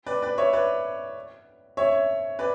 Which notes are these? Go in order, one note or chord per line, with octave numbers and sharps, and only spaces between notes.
B4 D5
B4 D5
C#5 E5
B4 D5
C#5 E5
B4 D5